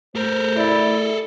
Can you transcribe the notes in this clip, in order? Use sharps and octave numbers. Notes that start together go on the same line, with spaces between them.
A3 A4 A#4 C5
E4 D5